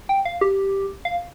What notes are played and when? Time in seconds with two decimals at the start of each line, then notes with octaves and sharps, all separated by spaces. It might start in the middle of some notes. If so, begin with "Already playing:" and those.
0.09 G5
0.25 F5
0.41 G4
1.05 F5